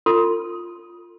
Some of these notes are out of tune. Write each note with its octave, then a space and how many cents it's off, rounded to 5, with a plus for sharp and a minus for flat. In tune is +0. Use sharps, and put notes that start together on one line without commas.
F4 +0 A4 +45 C6 +0